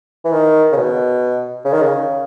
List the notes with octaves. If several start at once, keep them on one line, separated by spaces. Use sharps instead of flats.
E3
D#3
C#3
B2
C#3
D#3
C#3